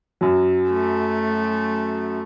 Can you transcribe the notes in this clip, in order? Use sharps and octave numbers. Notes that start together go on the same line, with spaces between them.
F#2 F#3
A3